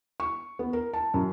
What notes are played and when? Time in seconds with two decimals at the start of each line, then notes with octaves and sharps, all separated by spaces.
0.20 C#6
0.59 B3
0.73 A#4
0.93 A5
1.14 F#2